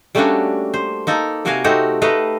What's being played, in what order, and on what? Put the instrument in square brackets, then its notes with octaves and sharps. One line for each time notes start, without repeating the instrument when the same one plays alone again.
[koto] G3 A3 A#3 C#4 D4 F#4
C5
A#3 D#4 A4
C3 A#3 F#4 A#4 F5 G#5
A3 C4 D#4 F#4 G4
A3 B4 D#5 F5 A#5